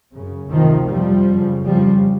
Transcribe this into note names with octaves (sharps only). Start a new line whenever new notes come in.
F#2 C#3
D2 C3 D#3 F3
F2 C3 F3 G3
F#2 C#3
F2 C#3 F3 G3